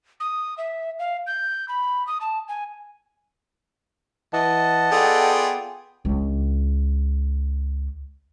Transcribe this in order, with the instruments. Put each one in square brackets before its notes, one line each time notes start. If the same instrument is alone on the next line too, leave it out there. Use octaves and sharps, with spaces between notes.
[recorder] D#6
E5
F5
G6
B5
D#6
A5
G#5
[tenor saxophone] E3 [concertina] D#5 F#5 A5
[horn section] B3 G5 [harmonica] F4 G#4 D5 [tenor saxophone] A4
[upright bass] C#2 D4